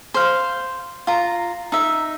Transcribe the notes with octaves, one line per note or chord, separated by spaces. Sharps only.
C5 F5
F4 A#5
D#4 E5